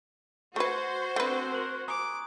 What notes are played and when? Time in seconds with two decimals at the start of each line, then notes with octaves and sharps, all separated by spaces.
0.56 A3 F#4 B4 C5 C#6 G#6
1.16 A3 C4 D4 B4
1.51 A#4 C6 F#6 F#7
1.88 G#5 A#5 D6 D#6